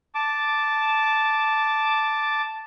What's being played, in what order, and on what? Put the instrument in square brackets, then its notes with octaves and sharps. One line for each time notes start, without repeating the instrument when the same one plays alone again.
[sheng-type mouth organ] A5 D6